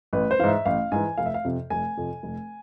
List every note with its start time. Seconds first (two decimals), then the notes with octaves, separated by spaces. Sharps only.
0.13 A1 B4
0.31 C5
0.39 E3 F5
0.44 G#2 E5
0.66 A1 F5
0.92 G#2 E3 G#5
1.18 F1 F5
1.26 E5
1.34 F5
1.45 F2 C3
1.70 F1 G#5
1.97 F2 C3
2.23 F1